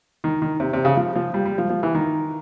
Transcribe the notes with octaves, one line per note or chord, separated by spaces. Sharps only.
D#3
D#3
C3
C3
C#3
F3
F3
G3
G3
F3
F3
E3
D#3